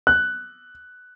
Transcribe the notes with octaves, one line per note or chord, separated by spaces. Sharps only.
F#6